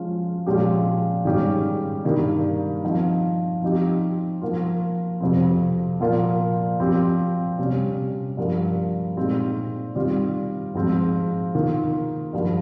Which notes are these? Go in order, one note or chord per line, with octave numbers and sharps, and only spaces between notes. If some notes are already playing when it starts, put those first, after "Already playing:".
Already playing: F3 G#3 C#4 F4
A#2 F3 G#3 C#4 G4
G#2 D#3 G3 C#4 G4
G2 D#3 A#3
F3 C4 D#4
F3 C4 D#4 G4
F3 A#3 F4
F2 C3 F3 C4
A#2 F3 A#3 F4
F3 C4 G4
C3 G3 C#4
G2 F3 A#3
A#2 G#3 C4 D#4 G4
D#3 G3 C4 F4
G#2 F3 C4 F4
D#3 A#3 F4
G2 F3 A#3